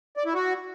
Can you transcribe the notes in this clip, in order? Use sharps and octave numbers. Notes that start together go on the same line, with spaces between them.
D5
E4
F#4